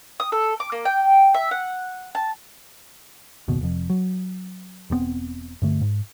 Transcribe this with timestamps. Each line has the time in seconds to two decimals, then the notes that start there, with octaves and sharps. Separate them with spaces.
0.20 D#6
0.32 A4
0.60 D6
0.72 A#3
0.85 G5
1.34 E5
1.51 F#5
2.15 A5
3.48 F#1 D#2 B2
3.61 F1 F2
3.90 F#3
4.90 E1 G2 B3 C4
5.62 G2 D3 A3
5.81 G#2